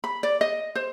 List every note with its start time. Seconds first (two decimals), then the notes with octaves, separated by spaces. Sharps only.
0.04 B5
0.23 D5
0.41 D#5
0.75 C5